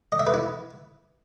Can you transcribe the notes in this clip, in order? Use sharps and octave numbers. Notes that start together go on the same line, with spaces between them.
D#5
E5
B4
E4